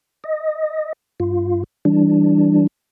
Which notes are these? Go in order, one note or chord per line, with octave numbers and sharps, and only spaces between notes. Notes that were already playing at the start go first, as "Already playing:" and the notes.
D#5
G2 F4
E3 G3 D4